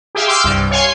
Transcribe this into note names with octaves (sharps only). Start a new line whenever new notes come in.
G4 G#4 E5 F5
G5 C6 D6 E6 F6 G6
C2 G2
C#5 F5 G#5 C6